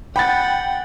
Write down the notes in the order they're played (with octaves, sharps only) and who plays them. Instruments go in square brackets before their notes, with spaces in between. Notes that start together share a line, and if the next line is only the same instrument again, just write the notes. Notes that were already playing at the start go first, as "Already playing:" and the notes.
[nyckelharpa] F#5 [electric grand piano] G5 [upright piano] B5 A6